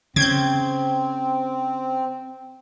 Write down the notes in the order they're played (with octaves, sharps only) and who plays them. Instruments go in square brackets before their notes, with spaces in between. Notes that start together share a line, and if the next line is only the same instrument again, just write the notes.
[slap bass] C#3 [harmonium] C4 [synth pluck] G6 G#6